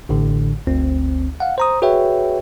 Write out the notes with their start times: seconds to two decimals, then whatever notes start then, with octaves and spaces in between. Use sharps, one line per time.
0.09 A1 A2 D3
0.67 G1 D2 C4
1.40 F5 F#5
1.58 C5 A#5 D#6
1.82 F#4 G#4 B4 C#5 E5 G5